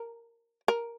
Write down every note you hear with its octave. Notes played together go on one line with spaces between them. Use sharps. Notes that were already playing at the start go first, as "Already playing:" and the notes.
Already playing: A#4
A#4